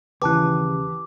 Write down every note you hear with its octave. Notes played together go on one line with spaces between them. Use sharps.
D#2 C#3 E3 G4 B4 A5 D6 F#6